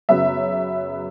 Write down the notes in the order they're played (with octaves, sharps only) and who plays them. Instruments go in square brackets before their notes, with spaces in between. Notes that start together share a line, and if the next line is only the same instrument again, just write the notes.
[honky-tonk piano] F#2 C#3 F#3 B3 E5